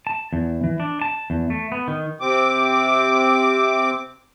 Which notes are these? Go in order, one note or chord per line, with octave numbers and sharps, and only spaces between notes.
A5
E2
E3
D4
A5
E2
A3
B3
D#3
C3 C4 D6